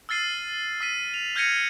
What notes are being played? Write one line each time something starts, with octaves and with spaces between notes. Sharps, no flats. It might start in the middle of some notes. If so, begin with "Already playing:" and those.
E6 F6 A6 C7 D#7
E6 B6 D#7
F7
F6 G6 G#6 A#6 C#7 D#7